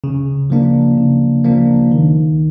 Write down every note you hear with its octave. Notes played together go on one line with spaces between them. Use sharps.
C#3
F3 A#3 D4
C#3
F3 A#3 D4
D#3